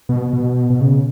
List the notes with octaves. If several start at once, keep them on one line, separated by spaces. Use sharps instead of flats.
B2
B2
B2
C#3